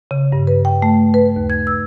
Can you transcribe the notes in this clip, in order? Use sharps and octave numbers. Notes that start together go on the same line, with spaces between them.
C#3
G2
B4
G5
A3
B4
D#2
G#6
E6